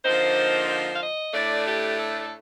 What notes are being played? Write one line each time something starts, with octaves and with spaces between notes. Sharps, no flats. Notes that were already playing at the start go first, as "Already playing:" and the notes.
D3 F3 A#3 D#4 C5
C5
F5
D#5
A2 A3 D4 D5
G4
A4